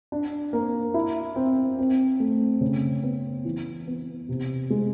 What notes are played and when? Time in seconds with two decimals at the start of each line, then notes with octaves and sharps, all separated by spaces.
0.12 D4
0.53 A#3
0.94 E4
1.36 C4
1.79 C4
2.20 A3
2.61 C#3
3.03 B3
3.45 E3
3.87 B3
4.29 C3
4.70 G#3